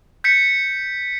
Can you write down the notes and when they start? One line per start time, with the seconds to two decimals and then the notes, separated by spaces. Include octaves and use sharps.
0.24 G6 B6 C#7